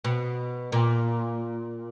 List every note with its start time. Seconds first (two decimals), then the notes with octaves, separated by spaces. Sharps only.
0.04 B2
0.72 A#2